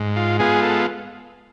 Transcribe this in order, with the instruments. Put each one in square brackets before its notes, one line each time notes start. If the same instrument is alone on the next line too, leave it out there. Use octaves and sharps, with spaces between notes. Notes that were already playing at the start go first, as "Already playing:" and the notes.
Already playing: [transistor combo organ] G#2
F4
G#3 B3 F4 G#4
A4